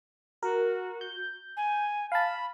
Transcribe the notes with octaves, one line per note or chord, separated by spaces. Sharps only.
F#4 A#4
G6
G#5
F5 A5 B5